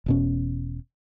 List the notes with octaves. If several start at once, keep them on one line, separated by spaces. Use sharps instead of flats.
E1 B2 C#4